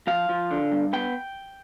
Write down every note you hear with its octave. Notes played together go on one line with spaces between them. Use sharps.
F3 F5
F3
D3
G2
B3 G5